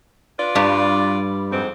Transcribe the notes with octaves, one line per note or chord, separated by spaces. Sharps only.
F4 B4 D5
G2 G3
F2 G#2 C4